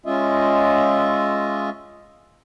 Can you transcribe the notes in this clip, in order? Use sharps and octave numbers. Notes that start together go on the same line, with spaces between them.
G#3 C#4 F4 D#5 E5